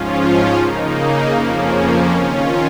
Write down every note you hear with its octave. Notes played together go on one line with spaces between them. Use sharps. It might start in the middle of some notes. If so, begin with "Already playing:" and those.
Already playing: G#2 F3 C#4 F4
C#3 A#3 D#4
F2 C#3 F3 A#3 C#4
D#3 C#4 F4